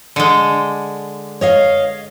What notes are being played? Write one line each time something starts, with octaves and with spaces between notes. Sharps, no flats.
D3 G#3
C#5 D#5 F5